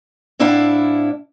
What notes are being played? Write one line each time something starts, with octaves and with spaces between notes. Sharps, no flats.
A2 C4 D4 E4 F5 F#5